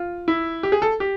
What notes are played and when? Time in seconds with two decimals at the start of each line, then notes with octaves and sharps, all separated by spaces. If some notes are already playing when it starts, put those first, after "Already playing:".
Already playing: F4
0.28 E4
0.63 G4
0.72 G#4
0.82 A4
1.00 G4